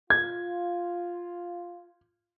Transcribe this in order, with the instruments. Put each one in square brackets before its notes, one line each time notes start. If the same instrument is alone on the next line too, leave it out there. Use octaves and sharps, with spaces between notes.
[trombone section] F4 [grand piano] G#6